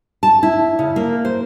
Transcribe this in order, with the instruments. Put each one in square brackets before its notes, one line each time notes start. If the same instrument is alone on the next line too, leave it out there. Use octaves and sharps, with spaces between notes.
[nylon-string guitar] A5
E4
C#3
A#3
C5